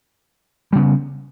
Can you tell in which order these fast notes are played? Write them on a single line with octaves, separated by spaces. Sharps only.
G3 C#3 B3